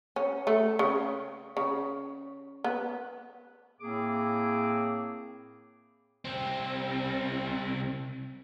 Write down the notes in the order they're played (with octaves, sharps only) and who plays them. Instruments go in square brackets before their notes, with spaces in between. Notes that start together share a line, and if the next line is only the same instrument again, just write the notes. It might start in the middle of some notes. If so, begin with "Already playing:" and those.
[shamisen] C#4
A3
C#3
C#3
B3
[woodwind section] A2 A#3 C4 G#4 D6
[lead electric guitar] C2 C4